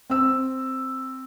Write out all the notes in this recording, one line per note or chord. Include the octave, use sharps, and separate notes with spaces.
C4 E6